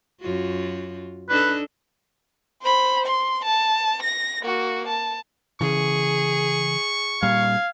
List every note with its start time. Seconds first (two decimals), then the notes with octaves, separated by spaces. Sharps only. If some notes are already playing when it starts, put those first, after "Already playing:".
0.21 F#2 F4 F#4
1.29 D4 D#4 A4 B4
2.62 C5 B5
3.06 C6
3.45 A5
4.02 A#6
4.42 A#3 F#4
4.88 A5
5.61 C#3 E3 G#4 C#6
7.23 A#2 G3 F5 G#6